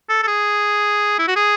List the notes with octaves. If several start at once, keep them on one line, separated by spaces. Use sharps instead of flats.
A4
A4
G#4
E4
F#4
G#4